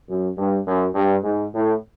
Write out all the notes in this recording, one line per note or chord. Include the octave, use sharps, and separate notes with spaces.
F#2
G2
F#2
G2
G#2
A2